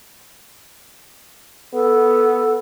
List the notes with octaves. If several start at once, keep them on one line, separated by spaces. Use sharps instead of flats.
B3 A4